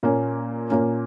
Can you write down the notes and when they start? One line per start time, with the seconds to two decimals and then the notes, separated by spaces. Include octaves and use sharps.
0.03 A#2 A#3 C#4
0.70 A#2 A#3 C#4